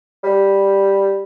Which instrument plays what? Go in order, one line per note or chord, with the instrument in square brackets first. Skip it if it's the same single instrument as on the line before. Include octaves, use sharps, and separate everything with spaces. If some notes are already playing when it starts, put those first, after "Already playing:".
[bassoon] G3